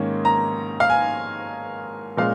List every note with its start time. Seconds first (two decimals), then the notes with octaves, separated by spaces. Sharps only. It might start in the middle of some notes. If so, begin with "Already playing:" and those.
Already playing: G#2 D#3 A#3 C#4
0.25 A#5
0.80 F5
0.90 G#5
2.17 A#2 G#3 C#4 F5